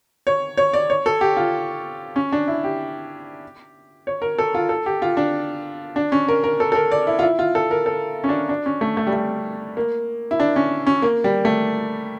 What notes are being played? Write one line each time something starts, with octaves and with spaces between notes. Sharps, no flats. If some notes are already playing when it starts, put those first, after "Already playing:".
C#5
C#5
D5
C#5
A4
G4
F4
C#4
D4
E4
G4
C#5
A#4
A4
F4
A4
G4
F4
D4
D4
C#4
A#4
A#4
A4
A4
A#4
D5
E4
F4
E4
F4
A4
A#4
A4
C#4
D4
D4
C#4
A3
A3
G3
A3
A#3
E4
D4
C#4
C#4
A#3
G3
A3